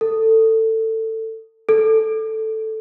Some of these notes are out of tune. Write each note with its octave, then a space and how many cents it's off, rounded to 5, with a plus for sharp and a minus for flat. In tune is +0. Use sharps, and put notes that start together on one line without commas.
A4 +20
A4 +0